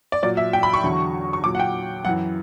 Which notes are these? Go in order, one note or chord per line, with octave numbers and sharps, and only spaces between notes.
D5
A#2 F#3 D5
E5
G5
B5
C#6
E2 D3 F#3
C#6
A#2 F#3 D6
F#5
G5
F#2 E3 F#5